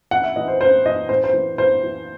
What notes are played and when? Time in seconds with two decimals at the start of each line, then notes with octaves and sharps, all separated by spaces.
0.11 E3 F#5
0.23 E5
0.36 E3 D#5
0.48 C5
0.61 E3 C5
0.86 E3 D#5
1.09 A2 C5
1.24 C5
1.34 E3
1.58 E3 C5
1.83 E3